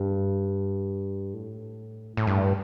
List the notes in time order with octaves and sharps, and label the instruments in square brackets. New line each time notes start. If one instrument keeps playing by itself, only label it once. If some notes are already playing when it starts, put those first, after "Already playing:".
Already playing: [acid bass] G2
A2
A2
G2